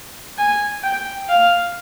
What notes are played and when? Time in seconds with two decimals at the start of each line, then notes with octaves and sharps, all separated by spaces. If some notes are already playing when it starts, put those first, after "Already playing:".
0.38 G#5
0.83 G5
1.29 F5